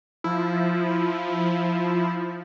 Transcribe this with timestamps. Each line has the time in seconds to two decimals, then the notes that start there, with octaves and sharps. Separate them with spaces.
0.24 F3 E4